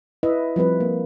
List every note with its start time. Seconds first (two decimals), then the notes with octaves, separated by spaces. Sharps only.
0.23 E4 B4 D#5 E5
0.56 F3 G3 C4 B4
0.80 A#3